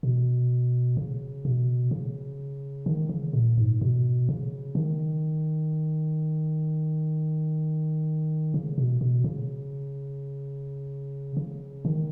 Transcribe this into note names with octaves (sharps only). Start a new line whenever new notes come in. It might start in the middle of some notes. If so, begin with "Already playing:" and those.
B2
C#3
B2
C#3
D#3
C#3
A#2
G#2
B2
C#3
D#3
C#3
B2
B2
C#3
C#3
D#3